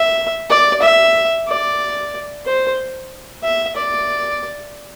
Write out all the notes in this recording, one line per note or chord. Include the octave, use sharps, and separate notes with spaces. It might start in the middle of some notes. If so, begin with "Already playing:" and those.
Already playing: E5
D5
E5
D5
C5
E5
D5